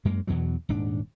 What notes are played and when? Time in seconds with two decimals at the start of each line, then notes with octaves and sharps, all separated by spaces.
0.05 F#2 G#3 A#3
0.27 E2 B2 E3 F#3
0.69 D#1 G#2 D4